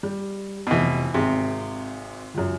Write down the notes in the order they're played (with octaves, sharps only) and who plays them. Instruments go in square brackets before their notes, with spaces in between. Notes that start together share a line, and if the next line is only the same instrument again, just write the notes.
[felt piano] G3
[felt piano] F1 D#5 [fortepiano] B2 E3
[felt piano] G#1 G#4 [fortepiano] C3
[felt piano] C#2 F#2